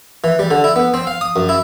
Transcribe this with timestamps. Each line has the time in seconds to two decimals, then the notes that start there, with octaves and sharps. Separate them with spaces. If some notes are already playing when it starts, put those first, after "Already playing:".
0.24 E3
0.39 G3
0.51 D3
0.64 E4
0.76 B3
0.94 C4
1.07 F5
1.21 D#6
1.36 F#2
1.49 E4